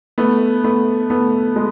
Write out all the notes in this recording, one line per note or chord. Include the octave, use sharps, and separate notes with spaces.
A3 B3
A3 B3
A3 B3
G#3